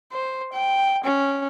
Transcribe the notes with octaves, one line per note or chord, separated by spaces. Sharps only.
C5
G5
C#4